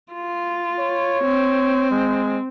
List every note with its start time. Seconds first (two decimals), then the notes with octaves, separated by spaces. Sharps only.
0.13 F4
0.79 C#5
1.24 C4
1.91 G#3